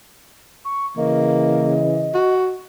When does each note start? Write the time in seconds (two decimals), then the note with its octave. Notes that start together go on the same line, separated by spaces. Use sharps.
0.65 C#6
0.97 C#3 E3 A#3 D#5
2.15 F#4